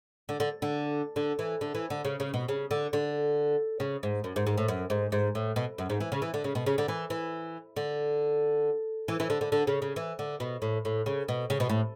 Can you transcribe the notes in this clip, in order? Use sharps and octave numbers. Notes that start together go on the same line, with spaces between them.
D3
D3
D3
D3
E3
D3
E3
D3
C#3
C#3
B2
C#3
D3
D3
C#3
G#2
F#2
G#2
G#2
A2
F#2
G#2
G#2
A2
B2
F#2
G#2
E3
C#3
E3
D3
C#3
B2
C#3
D3
E3
E3
D3
E3
E3
D3
D3
D3
C#3
C#3
E3
D3
B2
A2
A2
C#3
B2
C#3
B2
A2